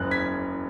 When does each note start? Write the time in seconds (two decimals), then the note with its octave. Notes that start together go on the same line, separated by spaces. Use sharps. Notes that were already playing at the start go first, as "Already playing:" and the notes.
Already playing: F#1 F#2 C#3 F#6
0.11 G#6 B6